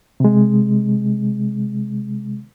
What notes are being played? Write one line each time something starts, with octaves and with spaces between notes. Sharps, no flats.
C3 G#3